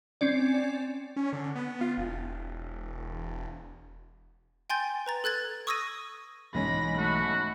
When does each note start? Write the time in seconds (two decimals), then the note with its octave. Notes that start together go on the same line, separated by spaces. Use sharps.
0.21 C4 C#4 D5
1.16 C#4
1.33 D3
1.55 B3
1.81 F4
1.98 E1
4.70 G5 G#5 C6 G6 A6
5.06 B4 A#5 A6
5.24 A4 F#6 G#6 A6
5.67 C#6 D#6 E6 G#6 A#6 D#7
6.54 B1 G#2 E3 G#3 C#4 B5 A#6
6.98 A3 F#4 B5